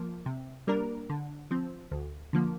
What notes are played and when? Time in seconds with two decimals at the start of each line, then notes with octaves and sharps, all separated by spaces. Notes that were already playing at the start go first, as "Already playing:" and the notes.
Already playing: F3 A#3
0.26 C3
0.67 G3 A#3 D4 A#4
1.09 D3
1.51 F3 C4
1.91 D2
2.33 D3 F3 A#3